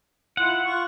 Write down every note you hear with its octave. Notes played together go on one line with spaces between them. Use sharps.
E4 F4 F#5 C6
F4 C#6